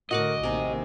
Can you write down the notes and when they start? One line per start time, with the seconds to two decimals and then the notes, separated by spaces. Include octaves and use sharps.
0.11 A2 D3 F#4 A#4 D#5 F#5 D6
0.43 A1 C3 D#3 A#3 A#4 G#5